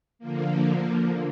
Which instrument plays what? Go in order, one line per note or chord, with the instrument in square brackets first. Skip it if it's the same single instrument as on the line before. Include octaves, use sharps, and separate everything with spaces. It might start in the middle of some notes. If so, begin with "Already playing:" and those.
[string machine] D3 F3 A#3